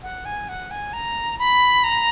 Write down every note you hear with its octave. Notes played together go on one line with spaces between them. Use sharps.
F#5
G#5
F#5
G#5
A#5
B5
A#5